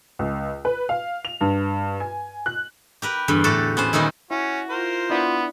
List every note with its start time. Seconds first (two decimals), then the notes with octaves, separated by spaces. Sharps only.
0.19 C#2
0.65 B4
0.89 F5
1.25 F7
1.41 G2
2.00 G#5
2.46 F#6
3.02 G4 A#4 B4
3.28 E2 G2 D3
3.44 A2 F#4 G4 A4
3.77 B3 C#4 C5
3.93 A#2 D#3 G3 D#4 E4
4.31 C#4 E4 F#4
4.70 F4 A#4 C5
5.10 B3 D4 E4 D5